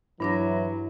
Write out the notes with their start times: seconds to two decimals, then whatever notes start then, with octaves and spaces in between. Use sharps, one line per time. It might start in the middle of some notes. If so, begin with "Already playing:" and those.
0.20 G2 E3 F#3 D4 E4 A#6